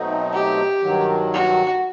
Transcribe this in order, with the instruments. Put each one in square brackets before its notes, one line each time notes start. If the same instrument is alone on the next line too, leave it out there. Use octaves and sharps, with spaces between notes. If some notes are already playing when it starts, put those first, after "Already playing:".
Already playing: [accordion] B2 F#3 A3 C4 D#4
[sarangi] G4
[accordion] G2 D#3 F#3
[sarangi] F#4